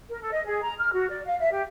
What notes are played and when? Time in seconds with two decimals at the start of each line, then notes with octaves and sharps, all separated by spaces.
0.09 A#4
0.20 A4
0.32 D#5
0.45 G#4
0.63 A#5
0.79 F6
0.93 F#4
1.09 D5
1.25 F5
1.39 E5
1.52 G4